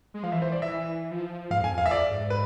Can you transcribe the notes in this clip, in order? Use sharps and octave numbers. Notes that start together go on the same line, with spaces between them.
G#3
F3 F5
E3 E5
C5
D5
E5
F3
G#2 F5
F2
G#5
F2
E2 F5
E5
F2 D5
G#2
B4